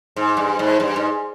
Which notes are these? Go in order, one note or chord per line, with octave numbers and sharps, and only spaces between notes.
G#2
G2
G#2
G2
G#2